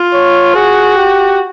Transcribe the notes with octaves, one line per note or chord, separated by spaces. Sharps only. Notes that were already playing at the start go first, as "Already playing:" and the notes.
Already playing: F4
C#5
F#4 G#4
G4